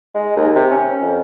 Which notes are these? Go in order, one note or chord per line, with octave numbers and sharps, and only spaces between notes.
G#3
D#2
C3
C#4
F2